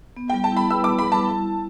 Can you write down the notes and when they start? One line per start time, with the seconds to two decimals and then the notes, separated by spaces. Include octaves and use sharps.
0.17 B3
0.29 G3 G5
0.44 A5
0.52 E4 B5
0.70 B4 E6
0.84 D6
0.89 B3
0.99 B5
1.07 G3 A5
1.25 E4
1.43 G3